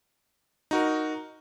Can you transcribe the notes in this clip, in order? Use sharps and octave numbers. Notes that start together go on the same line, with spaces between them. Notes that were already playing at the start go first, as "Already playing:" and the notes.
D#4 F#4 A#4